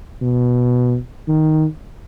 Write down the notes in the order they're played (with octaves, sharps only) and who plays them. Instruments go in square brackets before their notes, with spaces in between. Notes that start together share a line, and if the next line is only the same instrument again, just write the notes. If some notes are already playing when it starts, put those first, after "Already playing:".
[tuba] B2
D#3